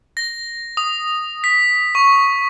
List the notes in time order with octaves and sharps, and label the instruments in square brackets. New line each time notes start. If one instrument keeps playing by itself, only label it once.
[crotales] A#6
D#6
B6
C#6